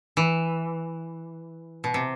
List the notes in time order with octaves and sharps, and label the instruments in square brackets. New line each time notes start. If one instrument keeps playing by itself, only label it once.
[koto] E3
B2
C3